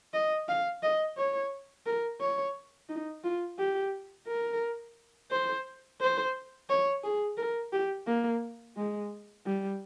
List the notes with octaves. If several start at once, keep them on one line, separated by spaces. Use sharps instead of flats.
D#5
F5
D#5
C#5
A#4
C#5
D#4
F4
G4
A#4
C5
C5
C#5
G#4
A#4
G4
A#3
G#3
G3